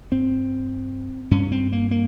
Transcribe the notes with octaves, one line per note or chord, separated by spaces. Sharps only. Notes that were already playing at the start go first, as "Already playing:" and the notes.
G2 C4
G2 C#4
C4
A#3
A#3